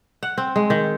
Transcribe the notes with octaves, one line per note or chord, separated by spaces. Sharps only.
F#5
C4
G#3
D#3